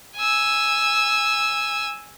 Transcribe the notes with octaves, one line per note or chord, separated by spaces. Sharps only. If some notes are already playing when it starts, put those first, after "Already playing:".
G#5 E6